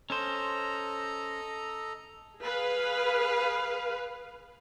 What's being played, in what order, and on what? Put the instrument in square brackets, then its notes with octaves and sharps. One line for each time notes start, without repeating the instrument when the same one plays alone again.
[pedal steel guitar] C#4 C5 [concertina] A4 D#5 A#5
[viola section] G#4 B4 F5